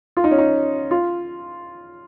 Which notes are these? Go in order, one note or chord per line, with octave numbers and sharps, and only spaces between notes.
F4
D#4
C#4
D#4
F4